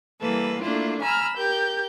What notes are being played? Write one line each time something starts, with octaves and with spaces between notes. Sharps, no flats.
E3 G3 A#3 A4 B4
A3 A#3 D4 E4 F4
G#5 A#5 B5 E6 F6
G4 A#4 G6